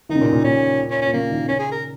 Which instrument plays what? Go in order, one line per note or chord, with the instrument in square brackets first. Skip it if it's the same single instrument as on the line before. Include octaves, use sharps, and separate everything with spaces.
[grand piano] D#3 [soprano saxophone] D#4
[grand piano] C#3
A#2
A#2
[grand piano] A#2 [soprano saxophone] C#4
[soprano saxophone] C#4
[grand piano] A#2 [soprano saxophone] C#4
[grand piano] C#3 [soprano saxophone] A#3
[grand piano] D#3
[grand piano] C#3 [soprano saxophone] C#4
[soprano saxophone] G#4
A#4